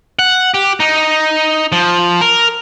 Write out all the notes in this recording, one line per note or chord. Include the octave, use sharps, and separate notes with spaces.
F#5
G4
D#4
F3
A#4